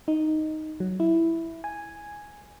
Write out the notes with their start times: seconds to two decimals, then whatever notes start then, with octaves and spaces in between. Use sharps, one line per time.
0.08 D#4
0.80 F#3
1.00 E4
1.64 G#5